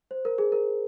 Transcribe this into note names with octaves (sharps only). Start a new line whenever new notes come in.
C5
A#4
G#4
A#4